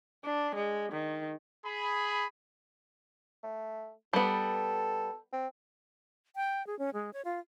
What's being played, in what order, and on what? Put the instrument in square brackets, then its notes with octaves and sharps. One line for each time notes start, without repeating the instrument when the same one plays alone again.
[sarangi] D4
G#3
D#3
[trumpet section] G#4 B5
[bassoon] A3
[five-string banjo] G3 B3 [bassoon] A4
[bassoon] C4
[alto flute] G5
G#4
C#4
G#3
C#5
F4